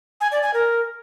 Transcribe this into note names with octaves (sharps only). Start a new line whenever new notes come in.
G#5
D5
G#5
A#4